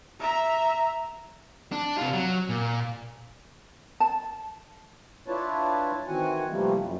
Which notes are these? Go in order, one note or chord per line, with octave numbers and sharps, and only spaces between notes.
E5 A#5
D4
C3 F4
F#3
A#2
A5
D4 E4 F4 B4 C#5 A5
D#3 E3 C4 F#4 F#5 G#5
C3 E3 F3 G3 A3 A#3
F#2